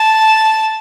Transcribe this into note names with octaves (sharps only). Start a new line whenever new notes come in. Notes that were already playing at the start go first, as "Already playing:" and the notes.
Already playing: A5